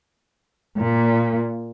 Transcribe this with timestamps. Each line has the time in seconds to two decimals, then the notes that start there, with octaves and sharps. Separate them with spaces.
0.78 A#2